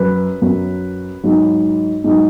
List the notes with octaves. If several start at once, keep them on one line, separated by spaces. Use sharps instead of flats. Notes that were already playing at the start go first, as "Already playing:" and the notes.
Already playing: F#2 F#3 B4
F#2 F#3
G#2 F#3
G#2 F#3